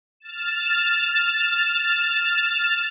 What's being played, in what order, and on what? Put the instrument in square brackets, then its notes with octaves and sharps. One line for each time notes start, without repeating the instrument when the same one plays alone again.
[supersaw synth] F6 A6 E7